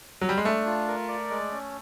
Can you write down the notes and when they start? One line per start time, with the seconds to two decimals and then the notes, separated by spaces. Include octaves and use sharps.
0.21 F#3
0.29 G3
0.37 G#3
0.45 A3 D4
0.66 F4
0.88 A#4
1.08 D5
1.30 G#3
1.52 C#4